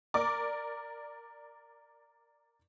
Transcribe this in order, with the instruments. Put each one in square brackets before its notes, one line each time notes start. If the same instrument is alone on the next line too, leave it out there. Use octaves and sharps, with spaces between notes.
[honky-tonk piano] A#4 D5 D6